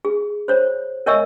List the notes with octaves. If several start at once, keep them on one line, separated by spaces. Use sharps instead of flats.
G#4
C5 C#5
A#4 C#5 D#5 E5 C#6 E6